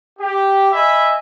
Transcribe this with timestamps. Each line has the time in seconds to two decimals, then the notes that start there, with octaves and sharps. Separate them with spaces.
0.19 G4
0.72 D#5 E5 G#5 B5